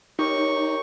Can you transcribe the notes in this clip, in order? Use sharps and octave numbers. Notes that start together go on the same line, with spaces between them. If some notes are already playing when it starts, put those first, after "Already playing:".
D#4 G4 A#4 C#5 C#6